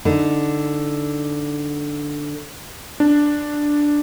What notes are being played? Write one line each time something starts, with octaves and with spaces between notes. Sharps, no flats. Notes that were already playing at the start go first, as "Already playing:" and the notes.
D3 D#4
D4